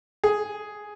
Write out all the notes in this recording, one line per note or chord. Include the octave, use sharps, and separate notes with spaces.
G#4